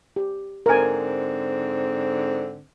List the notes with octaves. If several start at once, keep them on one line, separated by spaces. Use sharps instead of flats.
G4
G#2 D3 C4 A#4 G#5